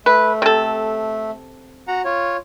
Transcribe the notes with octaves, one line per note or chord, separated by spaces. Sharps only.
A3 B4
C3 A4
F#4 F#5 A#5
F4 C#5